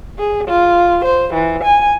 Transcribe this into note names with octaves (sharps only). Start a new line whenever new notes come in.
G#4
F4
C5
E3
G#5